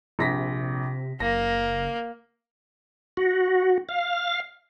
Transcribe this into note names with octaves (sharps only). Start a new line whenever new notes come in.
A#1 C3 A#6 B6
F#1 A#3 A#6
F#4
F5